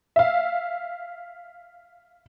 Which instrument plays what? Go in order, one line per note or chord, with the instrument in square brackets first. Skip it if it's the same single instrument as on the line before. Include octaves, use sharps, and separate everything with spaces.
[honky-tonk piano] E5 F5